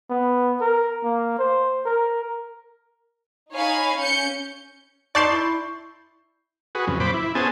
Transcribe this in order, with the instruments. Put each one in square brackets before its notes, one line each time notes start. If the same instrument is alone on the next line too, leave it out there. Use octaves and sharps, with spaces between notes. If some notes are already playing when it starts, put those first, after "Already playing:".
[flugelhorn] B3
A#4
A#3
C5
A#4
[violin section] D#4 C#5 F5 G#5 B5
C#4 G6 C#7
[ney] D#4 [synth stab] D5 A5 C6 [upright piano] C#6 G6 C7
[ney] E4
[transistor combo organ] F#4 G#4 B4
F2 C#3 F#3
A#2 C5 B5 D6
E4
B3 C#4 G#4 C5 G#5 A5